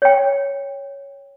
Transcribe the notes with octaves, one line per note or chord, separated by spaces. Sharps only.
C#5 G5